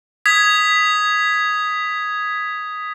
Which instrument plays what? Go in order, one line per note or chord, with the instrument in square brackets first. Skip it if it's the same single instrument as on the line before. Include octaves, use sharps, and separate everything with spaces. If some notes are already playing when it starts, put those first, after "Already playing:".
[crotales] D#6 G#6 B6